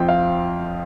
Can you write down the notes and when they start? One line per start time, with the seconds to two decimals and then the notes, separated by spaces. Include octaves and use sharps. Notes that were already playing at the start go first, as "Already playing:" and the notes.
Already playing: F2 F3 C4 G5
0.09 F5